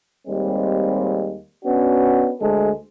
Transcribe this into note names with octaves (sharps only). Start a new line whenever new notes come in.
D#2 G3 G#3 C4
B3 C#4 D4 F#4
D2 G#3 A4